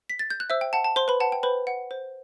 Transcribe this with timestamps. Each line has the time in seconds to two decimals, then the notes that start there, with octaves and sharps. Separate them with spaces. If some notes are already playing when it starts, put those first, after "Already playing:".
0.10 B6
0.19 A6
0.30 G6
0.40 F#6
0.50 C5 E5 E6
0.61 G5
0.73 F#5 A5
0.85 A5
0.96 C5 C6
1.08 B4 B5
1.20 F#5 A5
1.32 G5
1.43 B4 C5 B5
1.67 F#5
1.91 C5